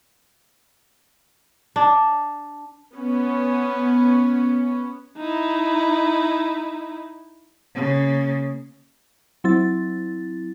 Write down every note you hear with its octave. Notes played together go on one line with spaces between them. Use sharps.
D4
B3 C#4
D#4 E4
C#3 A#3
F#3 C4 E4 A6